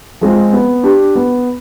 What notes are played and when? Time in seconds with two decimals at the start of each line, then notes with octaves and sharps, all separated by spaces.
0.21 F3 G#3 C4 F4
0.53 B3
0.83 D4 G4
1.15 B3